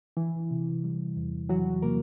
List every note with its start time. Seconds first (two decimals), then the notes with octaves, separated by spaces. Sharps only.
0.17 E3 E4
0.51 C3
0.84 G3
1.17 E2
1.49 E3 F#3 F#4
1.83 C3 A#3 A#4